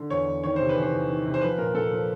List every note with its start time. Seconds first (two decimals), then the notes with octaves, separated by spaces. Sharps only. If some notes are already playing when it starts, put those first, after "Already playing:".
Already playing: D3
0.10 E2 C#5
0.27 E2
0.44 D#3 C#5
0.56 C3 C5
0.69 B4
0.76 E2
0.82 C5
0.92 E2
1.09 D#3
1.25 C3
1.34 C5
1.41 F3 B4
1.58 A#2 A#4
1.74 A#2 A4
1.91 F3